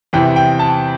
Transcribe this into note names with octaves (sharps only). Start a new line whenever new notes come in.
E2 C3 E3 G5
G5
A5